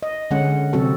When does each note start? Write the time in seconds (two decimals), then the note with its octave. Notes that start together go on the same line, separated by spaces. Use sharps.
0.03 D#5
0.31 D3 G#3 C#4 F#5
0.73 C3 F#3 C4 F#4 A4